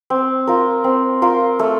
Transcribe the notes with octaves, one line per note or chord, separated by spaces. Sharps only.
C4
F4 A#4
C4
F4 A#4
A3